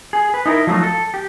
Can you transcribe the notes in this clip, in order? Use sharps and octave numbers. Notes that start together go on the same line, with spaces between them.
G#4
B4
D#4 E4 A4 A#4
F3 F#3 A3 D#4
A4
G4